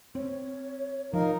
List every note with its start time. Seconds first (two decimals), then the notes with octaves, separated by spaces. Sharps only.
0.15 C4 C#5
1.13 F3 D#4 A#4 F5